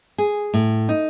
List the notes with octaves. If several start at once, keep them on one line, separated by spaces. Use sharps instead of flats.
G#4
A2
D#4